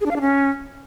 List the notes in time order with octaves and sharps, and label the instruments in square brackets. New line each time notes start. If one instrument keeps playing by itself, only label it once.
[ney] G#4
D4
F5
D4
C#4